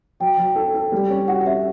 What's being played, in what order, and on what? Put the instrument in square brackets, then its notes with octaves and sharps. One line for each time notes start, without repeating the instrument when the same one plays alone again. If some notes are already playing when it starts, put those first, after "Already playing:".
[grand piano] F#3 [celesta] G5
[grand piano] F#3
A4
A4
G3
C#4
[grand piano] F#4 [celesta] F#5
[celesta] F#5
[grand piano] C#4 [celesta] E5